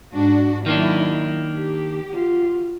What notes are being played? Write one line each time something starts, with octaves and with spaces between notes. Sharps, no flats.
G#2 D4 F#4
D#3 F#3 A#3 D4 E4
G4
F4 F#4